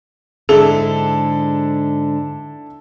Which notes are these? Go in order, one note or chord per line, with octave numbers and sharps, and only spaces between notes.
G#2 D3 D4 E4 G#4 A4